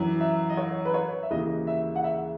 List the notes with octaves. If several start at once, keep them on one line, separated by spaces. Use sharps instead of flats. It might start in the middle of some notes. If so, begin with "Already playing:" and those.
Already playing: F#2 E3
E5
D#5
C#5
B4
C#5
E5
D#2 C#3 E3 D#5
E5
F#5
E5